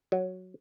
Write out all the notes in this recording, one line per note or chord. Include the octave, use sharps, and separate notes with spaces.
F#3